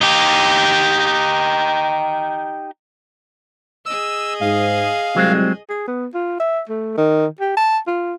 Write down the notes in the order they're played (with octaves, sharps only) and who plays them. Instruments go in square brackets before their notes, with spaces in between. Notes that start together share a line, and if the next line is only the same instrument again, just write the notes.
[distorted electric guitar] D#4 G4
[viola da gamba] G#4 D#5 [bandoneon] E6
[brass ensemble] G#2 [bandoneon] F5
[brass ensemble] C2 [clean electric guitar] F#3 G#3 C4
[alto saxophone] G#4
B3
F4
E5
A3
D#3
G4
A5
F4